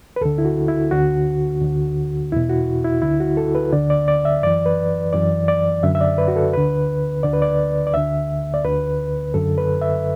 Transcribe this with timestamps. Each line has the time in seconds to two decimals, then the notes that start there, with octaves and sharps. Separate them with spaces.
0.16 B4
0.21 D2 D3 A4
0.38 E4
0.45 F#4
0.68 E4
0.91 D2 D3 F#4
1.62 D2 D3
2.32 E2 B2 E4
2.49 F#4
2.84 E4
3.02 D2 D3 E4
3.20 F#4
3.37 A4
3.55 B4
3.73 D2 D3 D5
3.90 D5
4.08 D5
4.25 E5
4.43 F#2 E3 D5
4.66 B4
5.13 F#2 E3 D5
5.48 D5
5.83 F#2 D3 E5
5.95 E5
6.01 D5
6.18 B4
6.28 F#4
6.36 A4
6.53 D2 D3 B4
7.23 D2 D3 D5
7.33 B4
7.42 D5
7.87 D5
7.94 D2 D3 E5
8.54 D5
8.65 D2 D3 B4
9.34 F#2 D3 A4
9.58 B4
9.82 E5